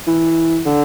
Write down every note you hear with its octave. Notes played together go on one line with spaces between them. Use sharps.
E3
D3